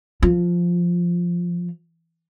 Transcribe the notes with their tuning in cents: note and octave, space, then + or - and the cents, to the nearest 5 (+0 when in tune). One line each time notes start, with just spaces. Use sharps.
F3 +0 F4 +0